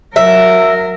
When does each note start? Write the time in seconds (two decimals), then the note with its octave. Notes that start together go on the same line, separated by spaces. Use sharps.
0.16 F#3 A#4 E5